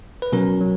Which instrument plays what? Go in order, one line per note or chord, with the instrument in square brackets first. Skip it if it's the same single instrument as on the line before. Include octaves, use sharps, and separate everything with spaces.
[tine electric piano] B4
B2 F#3 C#4 A#4
F#3